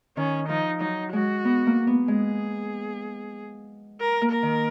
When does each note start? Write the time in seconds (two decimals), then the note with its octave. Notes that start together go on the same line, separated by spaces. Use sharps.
0.17 D#3 C#4
0.48 F3 D#4
0.80 F#3 D#4
1.13 G#3 F#4
1.45 B3
1.67 A#3
1.87 B3
2.08 G#3 G#4
4.00 A#4
4.21 A#3
4.32 A#4
4.43 D#3